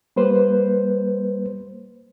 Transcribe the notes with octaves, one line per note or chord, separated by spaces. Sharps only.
G3 A#3 B4 C5